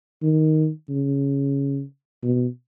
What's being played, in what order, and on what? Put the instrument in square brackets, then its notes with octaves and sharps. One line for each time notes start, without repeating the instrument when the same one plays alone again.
[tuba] D#3
C#3
B2